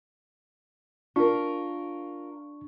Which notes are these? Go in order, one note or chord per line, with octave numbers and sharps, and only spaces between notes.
D4 F4 A#4 C#6